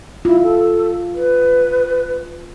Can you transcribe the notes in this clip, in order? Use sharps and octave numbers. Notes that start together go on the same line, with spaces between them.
E4 F4
A4
B4